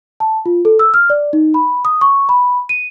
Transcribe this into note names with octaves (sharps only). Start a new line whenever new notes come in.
A5
F4
A4
E6
F6
D5
D#4
B5
D#6
C#6
B5
D#7